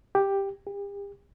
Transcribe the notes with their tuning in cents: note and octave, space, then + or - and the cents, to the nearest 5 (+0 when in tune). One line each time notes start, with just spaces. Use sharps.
G4 +5
G4 +40